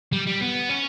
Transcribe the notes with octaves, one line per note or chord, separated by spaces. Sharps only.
G3
G3
B3
C#4